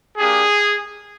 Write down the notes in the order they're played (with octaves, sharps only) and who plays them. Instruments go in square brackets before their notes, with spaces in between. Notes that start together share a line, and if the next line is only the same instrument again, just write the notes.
[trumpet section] A#3 D4 G4 G#4